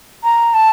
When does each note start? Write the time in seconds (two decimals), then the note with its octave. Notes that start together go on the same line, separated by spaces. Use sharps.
0.23 A#5
0.54 A5